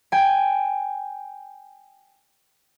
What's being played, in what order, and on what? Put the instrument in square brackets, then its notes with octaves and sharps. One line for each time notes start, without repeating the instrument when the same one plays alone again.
[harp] G5 G#5